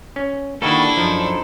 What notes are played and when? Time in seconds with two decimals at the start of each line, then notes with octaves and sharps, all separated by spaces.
0.16 C#4
0.62 D#3 G3 A#3 D4 E4 F#4 A4 A5
0.97 F#2 F3 D#4 C5